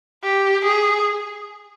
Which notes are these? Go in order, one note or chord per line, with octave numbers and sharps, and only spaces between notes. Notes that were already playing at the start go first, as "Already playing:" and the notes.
G4
G#4